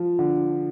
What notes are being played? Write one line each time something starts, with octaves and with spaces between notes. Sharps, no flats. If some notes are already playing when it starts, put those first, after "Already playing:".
Already playing: F3
D3